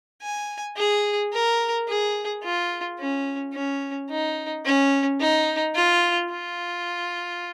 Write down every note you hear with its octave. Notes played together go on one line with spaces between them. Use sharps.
G#5
G#4
A#4
G#4
F4
C#4
C#4
D#4
C#4
D#4
F4
F4